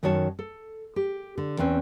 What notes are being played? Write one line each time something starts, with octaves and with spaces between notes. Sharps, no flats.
F#2 D#3 F#4 A4 C#5 A5
A4
G4
D3
E2 C4 C#4 B4 C5